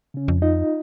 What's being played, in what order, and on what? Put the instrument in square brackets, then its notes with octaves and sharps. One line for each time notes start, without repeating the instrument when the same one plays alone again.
[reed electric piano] C#3 C#4
[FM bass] F2
[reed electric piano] D#4 F4 D#5